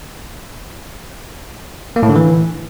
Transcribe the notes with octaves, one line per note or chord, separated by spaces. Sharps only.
A#3
A2
D3
E3